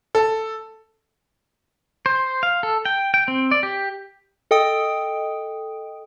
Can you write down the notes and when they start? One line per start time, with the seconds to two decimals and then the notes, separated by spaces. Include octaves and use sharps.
0.15 A4
2.06 C5
2.43 F5
2.63 A4
2.85 G5
3.14 G5
3.28 C4
3.51 D5
3.63 G4
4.51 A4 D#5 G5 D#6 D7